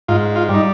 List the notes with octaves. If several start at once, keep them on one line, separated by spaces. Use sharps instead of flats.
G#2 F4
F4
G3 D#4